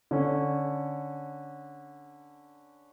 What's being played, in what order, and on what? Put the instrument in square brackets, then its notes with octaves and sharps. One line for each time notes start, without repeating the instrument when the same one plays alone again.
[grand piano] D3 C#4